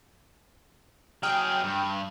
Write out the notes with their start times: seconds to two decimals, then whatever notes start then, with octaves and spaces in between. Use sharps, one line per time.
1.23 F#3 G#4 G5 F6
1.64 G2